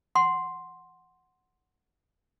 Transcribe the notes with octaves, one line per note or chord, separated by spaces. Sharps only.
F#5 C6